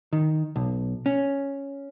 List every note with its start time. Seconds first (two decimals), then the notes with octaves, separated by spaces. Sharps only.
0.13 D#3
0.56 B1
1.06 C#4